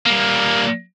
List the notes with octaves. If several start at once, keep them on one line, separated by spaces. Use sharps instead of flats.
G3 A#3